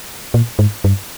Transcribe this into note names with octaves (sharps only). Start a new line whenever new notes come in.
A#2
G#2
G2